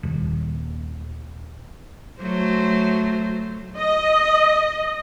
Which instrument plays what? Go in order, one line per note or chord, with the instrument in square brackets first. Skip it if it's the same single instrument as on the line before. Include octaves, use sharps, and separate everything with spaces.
[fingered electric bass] D#1
[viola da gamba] F#3 A3 C5
[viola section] D#5